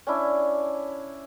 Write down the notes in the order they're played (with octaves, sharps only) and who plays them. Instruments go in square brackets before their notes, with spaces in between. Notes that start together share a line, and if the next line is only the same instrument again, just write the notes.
[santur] C#4 D4 E4